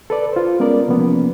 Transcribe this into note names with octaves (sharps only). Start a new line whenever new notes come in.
A4 B4 D5
F4 C5
G#3 B3 C#4 A#4 D5
E2 C3 F3 A#3 B3 C#4